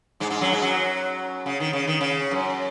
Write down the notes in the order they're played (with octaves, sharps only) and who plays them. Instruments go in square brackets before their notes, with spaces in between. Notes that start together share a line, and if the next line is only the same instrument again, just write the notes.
[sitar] G#2 G#3
G#2 G#3
F#2 F#3
G#2 G#3
F#2 F#3
C#3
D#3
C#3
D#3
C#3
F#2